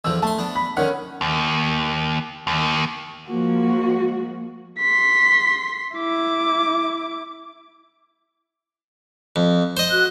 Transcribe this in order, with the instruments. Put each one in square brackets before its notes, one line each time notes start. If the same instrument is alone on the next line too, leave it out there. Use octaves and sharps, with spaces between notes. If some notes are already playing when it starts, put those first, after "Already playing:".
[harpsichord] E2 D3 F3 [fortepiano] E6
[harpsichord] A3 C6 [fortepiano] A5
[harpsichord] B3 D4
[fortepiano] B5
[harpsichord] D3 D#3 [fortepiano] C#4 F#5
[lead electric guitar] D#2
D#2
[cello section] F3 G#3 A#3 F#4
[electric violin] C6 B6
E4 D6
[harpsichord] F2
C5 D#5
[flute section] F#4 F#6